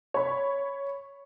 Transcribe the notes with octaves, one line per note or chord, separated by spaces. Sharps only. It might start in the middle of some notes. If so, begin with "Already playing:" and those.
C#5 B5